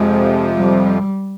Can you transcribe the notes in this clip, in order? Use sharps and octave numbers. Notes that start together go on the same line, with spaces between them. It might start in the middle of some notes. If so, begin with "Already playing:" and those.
Already playing: F2 C3 F3 G#3
G3